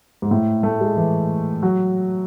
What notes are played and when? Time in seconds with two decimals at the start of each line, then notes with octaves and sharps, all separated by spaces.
0.22 G#2
0.31 A2
0.63 A3
0.81 G#3
0.97 E3
1.63 F#3